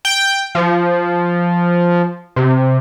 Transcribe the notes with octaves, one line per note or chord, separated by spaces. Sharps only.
G5
F3
C3